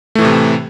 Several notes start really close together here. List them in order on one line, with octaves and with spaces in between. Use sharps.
A3 E3 A2 C3